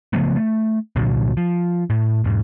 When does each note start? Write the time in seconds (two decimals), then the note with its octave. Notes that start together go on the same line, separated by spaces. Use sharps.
0.13 C#3 F3 A3 B3
0.36 A3
0.96 C2 A#2 D3 F#3
1.37 F3
1.90 A2
2.24 E1 G#2